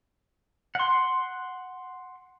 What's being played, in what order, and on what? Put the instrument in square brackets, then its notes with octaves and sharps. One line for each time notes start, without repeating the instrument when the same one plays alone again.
[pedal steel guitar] F#5 C6